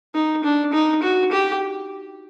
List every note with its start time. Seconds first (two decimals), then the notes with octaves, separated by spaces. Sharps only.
0.15 D#4
0.44 D4
0.73 D#4
1.03 F#4
1.32 G4